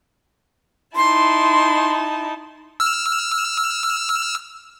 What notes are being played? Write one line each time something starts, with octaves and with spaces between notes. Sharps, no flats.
D#4 E4 A5 C6
E6 F6